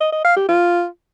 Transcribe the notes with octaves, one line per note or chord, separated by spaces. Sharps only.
D#5
D#5
F5
G4
F4